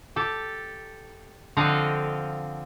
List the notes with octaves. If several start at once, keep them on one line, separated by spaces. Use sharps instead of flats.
G4 A4
D3 F3 C4 D#5 F5 F#5